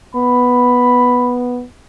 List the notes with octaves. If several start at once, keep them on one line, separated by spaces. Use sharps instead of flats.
B3 B5